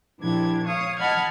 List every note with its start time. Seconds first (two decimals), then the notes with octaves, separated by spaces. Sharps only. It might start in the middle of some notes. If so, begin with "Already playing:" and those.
0.19 A#2 F3 D4 E4 G4 G#6
0.64 C#5 F5 C#6 D#6
0.98 D#5 F#5 A5 B5 F6 G#6